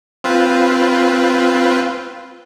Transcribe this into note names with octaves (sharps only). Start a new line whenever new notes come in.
C4 F4 B4